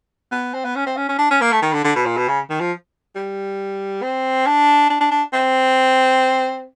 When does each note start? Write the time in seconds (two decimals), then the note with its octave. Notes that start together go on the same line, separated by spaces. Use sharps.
0.32 B3
0.54 C4
0.65 B3
0.76 C#4
0.86 C4
0.97 C#4
1.08 C#4
1.19 D4
1.31 C#4
1.41 A#3
1.52 A3
1.62 D#3
1.73 D3
1.84 D3
1.95 B2
2.06 A#2
2.17 B2
2.28 C#3
2.50 D#3
2.60 F3
3.16 G3
4.02 C4
4.46 D4
4.90 D4
5.00 D4
5.11 D4
5.33 C4